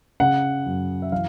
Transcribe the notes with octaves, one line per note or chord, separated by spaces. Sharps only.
C#3 F#5
F#2
E5
E3 F5